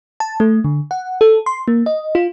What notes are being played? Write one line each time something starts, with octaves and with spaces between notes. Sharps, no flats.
A5
A3
D3
F#5
A4
C6
A#3
D#5
F4